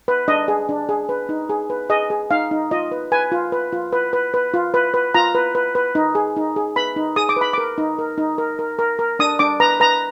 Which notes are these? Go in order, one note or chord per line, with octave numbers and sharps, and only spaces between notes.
B4
D4 D#5
G#4
D4
G#4
B4
D#4
G#4
B4
G#4 D#5
G#4
D#4 F5
D#4
F4 D#5
B4
B4 G#5
F4
B4
F4
B4
B4
B4
F4
B4
B4
F4 A#5
B4
B4
B4
D#4
G#4
D#4
G#4
B4 B5
D#4
G#4 D#6
D6
B4 B5
A#4 D6
D#4
A#4
D#4
A#4
A#4
A#4
A#4
D4 D#6
D4 D6
B4 A#5
B4 A#5